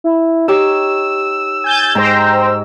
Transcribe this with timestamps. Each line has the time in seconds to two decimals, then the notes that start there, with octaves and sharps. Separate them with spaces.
0.04 E4
0.48 D#4 G4 C#5 E6
1.64 G#5 G6 A6
1.95 G#2 C5 G5 A#5